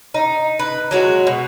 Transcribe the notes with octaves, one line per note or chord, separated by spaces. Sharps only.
D#4
B4
F#3 G#3 F#4
B2